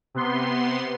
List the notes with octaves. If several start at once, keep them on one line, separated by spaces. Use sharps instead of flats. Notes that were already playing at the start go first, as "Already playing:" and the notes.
C3 B3 C6